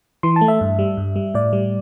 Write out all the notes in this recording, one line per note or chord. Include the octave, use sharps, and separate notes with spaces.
E3 C6
A5
A3
E5
G2
G3
G2
G3
A2 D5
G3